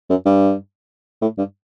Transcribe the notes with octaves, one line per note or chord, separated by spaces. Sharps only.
F#2
G2
A2
G2